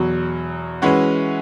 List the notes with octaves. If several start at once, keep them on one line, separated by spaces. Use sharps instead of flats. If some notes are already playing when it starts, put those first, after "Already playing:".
Already playing: E2 B2 F#3
E3 G#3 C#4 F#4 B4